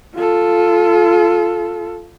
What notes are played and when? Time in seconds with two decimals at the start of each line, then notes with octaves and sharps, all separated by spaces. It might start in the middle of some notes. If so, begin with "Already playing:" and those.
0.15 F4 A4